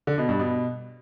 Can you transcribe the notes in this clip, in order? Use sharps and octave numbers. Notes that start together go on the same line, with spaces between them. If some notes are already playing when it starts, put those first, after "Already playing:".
D3
B2
G2
B2